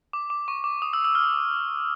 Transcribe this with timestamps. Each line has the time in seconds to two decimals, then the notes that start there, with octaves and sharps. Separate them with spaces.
0.13 D6
0.30 D6
0.48 C#6
0.64 D6
0.82 D#6
0.93 E6
1.05 E6
1.15 F6